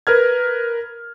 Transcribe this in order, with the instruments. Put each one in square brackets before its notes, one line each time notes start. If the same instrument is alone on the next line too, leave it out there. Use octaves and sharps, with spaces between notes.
[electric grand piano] A#4 B4 F6 G#6